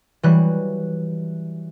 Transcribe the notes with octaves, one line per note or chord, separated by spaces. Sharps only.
E3 F#3 G3 F#6